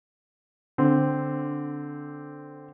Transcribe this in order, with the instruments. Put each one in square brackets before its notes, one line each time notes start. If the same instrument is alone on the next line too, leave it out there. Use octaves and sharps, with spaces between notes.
[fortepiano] D3 C4